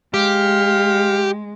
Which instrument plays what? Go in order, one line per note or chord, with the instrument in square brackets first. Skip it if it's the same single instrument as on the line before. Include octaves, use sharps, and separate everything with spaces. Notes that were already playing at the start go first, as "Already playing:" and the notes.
[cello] G#3 [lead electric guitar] G4 [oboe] F5